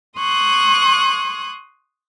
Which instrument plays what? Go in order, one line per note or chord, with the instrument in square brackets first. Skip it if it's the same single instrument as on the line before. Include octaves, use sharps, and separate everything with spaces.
[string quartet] C6 C#6 D#6 F#6 G#6